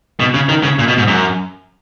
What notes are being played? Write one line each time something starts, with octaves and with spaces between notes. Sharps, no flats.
B2
C#3
D#3
C#3
A#2
B2
G#2
F#2